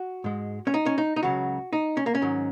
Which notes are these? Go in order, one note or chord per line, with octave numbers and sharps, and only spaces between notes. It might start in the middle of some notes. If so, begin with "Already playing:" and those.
Already playing: F#4
G#2 G#3
C#4
D#4
C#4
D#4
D#4
C#2 C#3 F#3 F#4
D#4
C#4
A#3
C#4
G#2 D#3 F#3